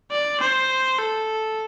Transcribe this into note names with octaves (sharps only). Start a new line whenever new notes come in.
D5
C5
A4